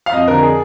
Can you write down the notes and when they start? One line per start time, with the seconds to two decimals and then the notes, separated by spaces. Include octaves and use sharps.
0.06 F5
0.12 F2 D#5
0.28 D3 A#4
0.43 G#4